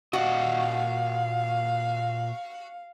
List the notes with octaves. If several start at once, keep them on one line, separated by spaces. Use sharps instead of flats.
A#2 F#4 D5 D#5 F5